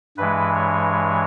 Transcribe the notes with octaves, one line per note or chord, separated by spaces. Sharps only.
G2 E3 G#3 B4
C#5